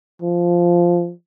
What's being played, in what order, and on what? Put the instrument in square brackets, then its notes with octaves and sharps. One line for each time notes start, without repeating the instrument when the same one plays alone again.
[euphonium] F3